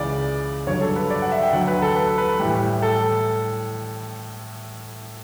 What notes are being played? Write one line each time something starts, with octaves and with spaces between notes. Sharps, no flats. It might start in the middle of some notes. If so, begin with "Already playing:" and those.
Already playing: C#2 C#3 E3 D5
G2 D3 F#3 C#5
A4
B4
D5
F#5
E5
G5
D2 D3 F#3 F#5
B4
A4
B4
B4
A2 E3 G3 G4
A4